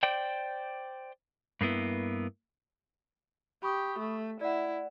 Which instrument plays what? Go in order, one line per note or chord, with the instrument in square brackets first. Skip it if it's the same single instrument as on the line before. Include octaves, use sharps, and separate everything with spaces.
[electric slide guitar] C5 D5 G5
G2 A#3 B3 E4
[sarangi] G4 [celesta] B5 C#6 D#6
[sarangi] A3
[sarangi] E4 [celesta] D5 F#5